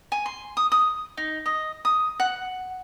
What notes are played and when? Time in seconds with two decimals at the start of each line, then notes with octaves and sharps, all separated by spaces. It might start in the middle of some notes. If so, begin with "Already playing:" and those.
0.12 G#5
0.26 C6
0.57 D#6
0.72 D#6
1.17 D#4
1.46 D#5
1.85 D#6
2.20 F#5